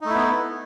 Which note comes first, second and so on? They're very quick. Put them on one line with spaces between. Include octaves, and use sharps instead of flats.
D#4 A3 E4 B3